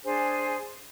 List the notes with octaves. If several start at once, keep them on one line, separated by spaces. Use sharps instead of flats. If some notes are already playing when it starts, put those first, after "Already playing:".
D4 G#4 C5 G#5